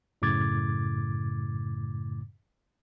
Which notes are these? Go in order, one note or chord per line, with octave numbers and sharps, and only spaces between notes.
F#2 A2 C#3 D6 G#6 A6